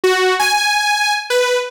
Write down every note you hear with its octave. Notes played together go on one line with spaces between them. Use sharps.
F#4
G#5
B4